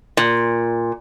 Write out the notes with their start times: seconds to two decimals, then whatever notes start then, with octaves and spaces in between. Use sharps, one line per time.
0.17 A#2